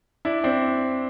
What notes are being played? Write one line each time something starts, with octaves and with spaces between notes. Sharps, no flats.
D4 E4
C4 D4